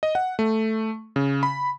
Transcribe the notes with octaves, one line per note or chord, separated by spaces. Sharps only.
D#5
F#5
A3
C#3
B5